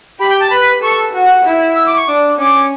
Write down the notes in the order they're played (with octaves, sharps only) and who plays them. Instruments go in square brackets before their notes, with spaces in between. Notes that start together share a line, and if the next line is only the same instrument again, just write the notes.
[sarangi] G4 [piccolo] B5
[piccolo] G5
A5
[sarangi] B4 [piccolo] B5
[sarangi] A4 [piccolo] C#6
[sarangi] F#4
E4
[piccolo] E6
D6
C#6
[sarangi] D4 [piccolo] D6
[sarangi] C#4 [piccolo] D6